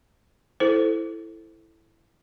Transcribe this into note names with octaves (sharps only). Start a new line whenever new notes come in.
E4 A4 C5